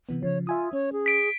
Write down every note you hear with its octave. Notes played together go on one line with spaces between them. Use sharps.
C3 E3 B3
C#3 F3 C#5
F4 E5 G#5 D#6
C#4 C#5
G#4
B6 D7